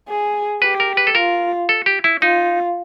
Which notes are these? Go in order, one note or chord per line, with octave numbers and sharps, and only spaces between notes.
G#4
G4 B4
A#4
B4
A4
F4 A#4
A4
G4
E4
D#4 F4